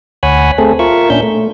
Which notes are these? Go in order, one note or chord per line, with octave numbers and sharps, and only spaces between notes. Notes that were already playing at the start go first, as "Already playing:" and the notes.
D2 C#5 F#5 G#5 B5
A3 C4 G#4 A4
F4 A#4 E5 C#6
A#2 C#4 D4 E5 G6
A3